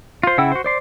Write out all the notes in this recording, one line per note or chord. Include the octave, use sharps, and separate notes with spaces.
F4 C5
C#3 E4 F#5 G5 E6
F#4 C5
C5 D5 C6